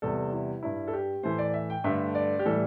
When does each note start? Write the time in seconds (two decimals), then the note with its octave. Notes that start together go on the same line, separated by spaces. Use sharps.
0.02 E2 C3 G3 A4
0.32 E4
0.63 G2 G3 E4
0.87 A4
0.93 G4
1.23 A2 E3 A3 C5
1.38 D5
1.54 E5
1.70 G5
1.84 G2 D3 A3 E5
2.15 D5
2.39 G4
2.45 A2 E3 G3 A4